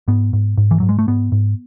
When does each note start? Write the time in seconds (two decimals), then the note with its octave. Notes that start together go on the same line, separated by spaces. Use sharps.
0.08 G#2 B3
0.33 G#2
0.57 G#2
0.71 E3
0.80 G#2 F#3
0.89 G#3
0.99 A3
1.07 G#2 B3
1.32 G#2